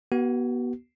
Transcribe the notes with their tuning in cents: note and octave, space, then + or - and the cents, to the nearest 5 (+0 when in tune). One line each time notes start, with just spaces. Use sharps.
B3 -25 F#4 +40